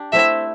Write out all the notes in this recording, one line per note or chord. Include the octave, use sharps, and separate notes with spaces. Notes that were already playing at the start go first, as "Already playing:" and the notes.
Already playing: D4 G4
A3 C4 E4 E5